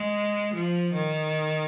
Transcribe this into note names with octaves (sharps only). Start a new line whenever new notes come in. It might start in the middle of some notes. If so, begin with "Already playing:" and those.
Already playing: G#3
F3
D#3